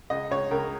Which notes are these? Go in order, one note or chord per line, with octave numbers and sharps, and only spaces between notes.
C#2 D#5
C#2 C#5
C#2 A#4